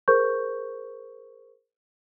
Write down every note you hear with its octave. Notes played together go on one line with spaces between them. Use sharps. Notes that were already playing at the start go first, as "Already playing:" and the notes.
G#4 A#4 C5 C#6 G6